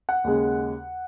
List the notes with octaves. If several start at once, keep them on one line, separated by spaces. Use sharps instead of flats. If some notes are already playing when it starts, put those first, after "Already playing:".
F#5
D#2 C#3 G#3